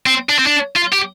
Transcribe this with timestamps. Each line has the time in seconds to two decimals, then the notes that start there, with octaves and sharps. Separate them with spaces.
0.06 C4
0.29 D4
0.39 C4
0.47 D4
0.76 F4
0.93 G4